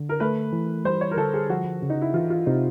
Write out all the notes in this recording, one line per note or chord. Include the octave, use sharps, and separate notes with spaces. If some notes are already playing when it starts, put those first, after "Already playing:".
Already playing: D3
A#4
A3 B4
E3
G3 C5
C#5
A#4
D3 A4
G#4
F3 F#4
C#3
D#4
E4
E3 F4
F4
C3 D#4